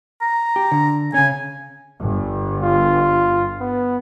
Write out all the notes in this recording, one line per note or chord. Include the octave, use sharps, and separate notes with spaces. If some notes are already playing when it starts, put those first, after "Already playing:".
A#5
G4
D3
C#3 C#4 G#5
G1
F4
B3